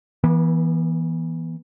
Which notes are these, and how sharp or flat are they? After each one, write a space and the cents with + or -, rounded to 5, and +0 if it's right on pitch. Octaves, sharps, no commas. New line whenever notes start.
E3 +0 B3 -35